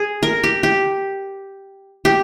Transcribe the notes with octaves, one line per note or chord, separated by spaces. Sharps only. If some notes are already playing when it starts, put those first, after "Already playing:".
Already playing: G#4
A#4
G4
G4
G4